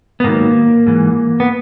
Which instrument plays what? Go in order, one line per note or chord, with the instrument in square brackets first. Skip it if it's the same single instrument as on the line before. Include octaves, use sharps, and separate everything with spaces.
[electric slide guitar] B3
G#2 D#3 F#3 A#3
G#2 E3
B3